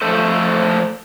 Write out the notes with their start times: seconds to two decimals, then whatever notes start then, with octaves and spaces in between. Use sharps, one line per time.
0.02 F3 A3 A4 C5